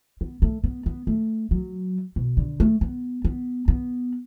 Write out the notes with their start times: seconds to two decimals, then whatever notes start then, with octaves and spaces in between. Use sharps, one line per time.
0.21 B3
0.42 A3
0.64 B3
0.86 B3
1.07 A3
1.51 F#3
2.16 B2
2.37 D3
2.60 A3
2.81 B3
3.25 B3
3.68 B3